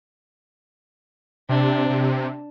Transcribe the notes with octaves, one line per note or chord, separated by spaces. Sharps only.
C3 D4
C3